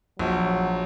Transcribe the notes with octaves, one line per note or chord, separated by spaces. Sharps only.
A#1 F#3